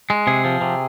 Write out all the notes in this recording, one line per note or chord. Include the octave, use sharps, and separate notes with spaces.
G#3
C3 G#4
F3
C3